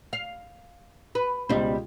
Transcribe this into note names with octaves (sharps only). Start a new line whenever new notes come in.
F5
B4
C#2 B2 G3 C5 D#5